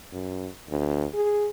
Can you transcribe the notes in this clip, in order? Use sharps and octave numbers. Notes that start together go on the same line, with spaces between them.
F#2
D2
G#4